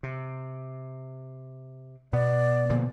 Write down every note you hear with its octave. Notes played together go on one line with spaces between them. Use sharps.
C3
B2 B3 D5
A#2 D3 F3